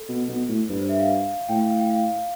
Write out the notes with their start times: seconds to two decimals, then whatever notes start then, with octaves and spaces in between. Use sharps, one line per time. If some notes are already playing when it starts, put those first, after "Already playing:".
Already playing: A4
0.09 B2
0.28 B2
0.48 A2
0.69 G2 B4
0.79 C5
0.89 E5
0.99 F5
1.49 A2 G5
1.59 F5
1.69 F5
1.79 G5
1.90 F5